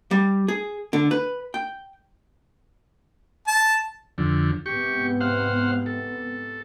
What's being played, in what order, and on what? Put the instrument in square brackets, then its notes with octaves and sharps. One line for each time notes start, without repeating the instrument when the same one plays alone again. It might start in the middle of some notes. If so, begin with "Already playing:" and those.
[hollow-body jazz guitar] G3
G#4
D3
B4
G5
[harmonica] A5
[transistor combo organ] F2 D3
[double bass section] G#2 C3 B3 [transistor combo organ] G4 C#6
[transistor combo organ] C5 F5 F#5
A4